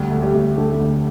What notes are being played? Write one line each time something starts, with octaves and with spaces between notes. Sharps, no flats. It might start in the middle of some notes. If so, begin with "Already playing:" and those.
Already playing: D2 G3 G4
A3
G3 G4
D2
D3 A3 A4
D2